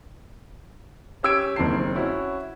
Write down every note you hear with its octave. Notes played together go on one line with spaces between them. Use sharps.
C#4 G4 E6 G#6 D7
F#1 D#2 C4 A5 C7
C#4 E4 F#4